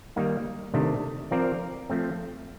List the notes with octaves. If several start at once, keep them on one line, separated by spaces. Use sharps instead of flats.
D#3 G3 A#3 D#4
C3 D#3 A3 D4
F3 C4 F4 A#4 D5
F3 A3 C4